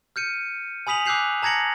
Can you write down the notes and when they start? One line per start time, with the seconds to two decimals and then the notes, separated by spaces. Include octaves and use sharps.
0.16 F6 G6 C#7 D#7
0.87 G#5 B5 D#6 B6 F7 F#7
1.06 D6 E6 F#6 G6 C7 F7
1.42 A5 A#5 G#6 A#6 C#7 F#7